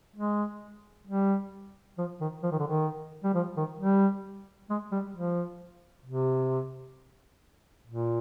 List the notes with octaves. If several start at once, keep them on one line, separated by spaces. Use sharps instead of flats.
G#3
G3
F3
D#3
F3
D#3
D3
D#3
G3
F3
D#3
G3
G#3
G3
F3
C3
A#2